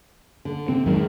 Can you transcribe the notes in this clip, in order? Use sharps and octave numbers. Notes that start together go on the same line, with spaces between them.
D3
C3 C4
F2 G#2 D#3 F#3 G#3